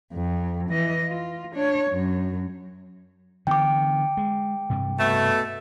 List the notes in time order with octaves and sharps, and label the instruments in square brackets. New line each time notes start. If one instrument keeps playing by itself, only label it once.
[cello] F2
E3 D#5
F4
D4 C#5
F#2
[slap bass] D3 E3 B3 [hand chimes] G5 D6
[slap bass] G#3
G2 C3
[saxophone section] B2 A3